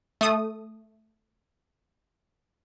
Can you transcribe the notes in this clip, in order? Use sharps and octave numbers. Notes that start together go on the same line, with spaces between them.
A3 D#6